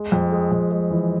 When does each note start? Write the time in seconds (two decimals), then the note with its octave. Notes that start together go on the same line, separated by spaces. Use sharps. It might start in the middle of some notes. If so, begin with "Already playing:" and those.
Already playing: G#3
0.12 F2
0.32 G#3
0.51 F2
0.71 G#3
0.91 E3